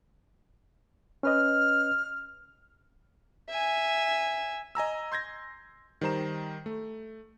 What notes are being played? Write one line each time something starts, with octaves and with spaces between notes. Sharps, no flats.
C#4 B4 D#5 F6
E5 G#5
D#5 G#5 A#5 E6
C6 G6 G#6 A#6
D#3 G3 C5 A#5 E7
A3